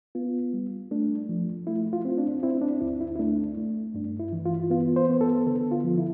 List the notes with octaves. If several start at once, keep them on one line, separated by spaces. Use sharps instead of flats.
B3 F4
G3
A3 D4
F3
A3 E4
F4
C4
D4
C4 E4
D4
D2 E4
E4
E4
A3 D4
A3
G2 D4
E4
E3
F4
B3 F4
C5
B3
A4
D3 A4
F4
F3
E4